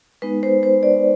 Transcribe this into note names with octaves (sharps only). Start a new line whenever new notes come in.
G#3 B3 D#4 B4
C5
C5
D5